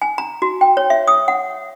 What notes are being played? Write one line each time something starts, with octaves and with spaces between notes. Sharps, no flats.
G#5
A#5
F#4
G5
C#5
E5
D#6
F#5